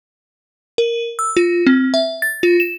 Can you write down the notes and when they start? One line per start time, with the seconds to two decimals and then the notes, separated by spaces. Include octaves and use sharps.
0.78 A#4
1.19 E6
1.37 F4
1.67 C4
1.94 E5
2.22 A6
2.43 F4
2.60 E7